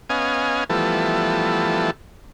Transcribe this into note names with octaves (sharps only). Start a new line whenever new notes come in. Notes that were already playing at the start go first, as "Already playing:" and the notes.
B3 C#4 D#5 F5 G#5
E3 F3 G3 A3 B3 A4